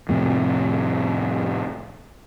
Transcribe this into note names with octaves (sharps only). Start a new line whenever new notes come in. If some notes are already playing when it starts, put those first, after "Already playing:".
F2 A2 C3